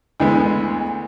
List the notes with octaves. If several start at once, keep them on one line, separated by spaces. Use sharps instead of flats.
D2 E3 G#3 B3